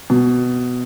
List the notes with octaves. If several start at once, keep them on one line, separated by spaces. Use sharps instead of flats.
B2